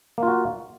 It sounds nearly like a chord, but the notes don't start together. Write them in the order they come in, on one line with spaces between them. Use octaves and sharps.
A#3 F4 F#4